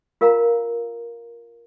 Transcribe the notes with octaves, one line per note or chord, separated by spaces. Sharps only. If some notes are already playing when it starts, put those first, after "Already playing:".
F4 A#4 F5 A#5